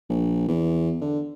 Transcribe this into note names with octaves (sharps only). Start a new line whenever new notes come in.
A#1
E2
D3